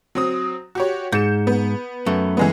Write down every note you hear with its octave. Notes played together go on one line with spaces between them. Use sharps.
F#3 C4 D#6
F#4 G4 C#5
G#2 G6 C#7 E7
B3
F#2 A3
E3 G#3 B3